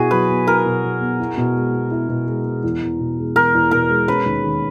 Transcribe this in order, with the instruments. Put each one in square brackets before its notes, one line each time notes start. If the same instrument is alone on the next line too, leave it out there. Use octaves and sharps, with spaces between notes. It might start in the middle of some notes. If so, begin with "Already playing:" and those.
Already playing: [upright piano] B2 E4 [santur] F#4 G#4
[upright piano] F#3 [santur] B4
[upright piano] B3
[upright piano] E4 [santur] A#4
[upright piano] B2
F#3
B3
E4
B2
G#3
B3
E4
B2
G#3
B3
E2
E2
B2
G#3
[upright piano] E2 [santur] A#4
[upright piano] E2
[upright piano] B2 [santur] A#4
[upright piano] G#3
[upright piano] C#4 [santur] B4
[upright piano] D#2
D#3